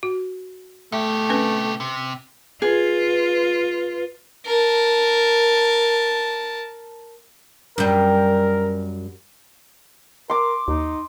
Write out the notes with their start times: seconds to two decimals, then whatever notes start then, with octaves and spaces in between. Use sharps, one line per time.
0.03 F#4
0.92 B2 A3 G4 E5
1.29 C4 C#4 B4
1.80 C3
2.62 F4 G#4 B4
4.46 A#4 A5
7.78 F#2 G3 A#4
10.30 A#4 C6 D6
10.68 D#2 D#4